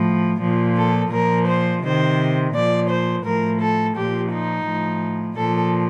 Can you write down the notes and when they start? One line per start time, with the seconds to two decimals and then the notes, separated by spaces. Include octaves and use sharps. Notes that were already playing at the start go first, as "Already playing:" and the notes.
Already playing: A2 F3
0.41 A#2 F3
0.77 A4
1.12 A#2 F3 A#4
1.47 C5
1.83 C3 D#3 C5
2.53 A#2 F3 D5
2.89 C5
3.24 A2 F3 A#4
3.60 A4
3.95 A#2 F3 G4
4.30 D#4
4.66 A2 F3
5.36 A#2 F3 A4